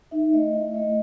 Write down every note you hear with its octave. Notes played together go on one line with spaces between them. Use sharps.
D#4 E5
A3 D#5
E4 E5
A3 D#5